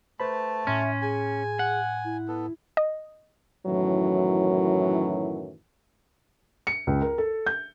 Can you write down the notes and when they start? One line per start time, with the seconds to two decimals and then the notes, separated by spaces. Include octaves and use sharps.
0.20 A3 B4 C5 A5 B5
0.67 A2 C#4 E5 C6 F6
1.02 G#4 G#5
1.59 F#5
2.05 E4
2.28 B3 A4
2.77 D#5
3.66 F#2 A2 D#3 E3 F#3
6.67 C#7
6.87 C#2
7.02 A#4
7.18 A4
7.46 G6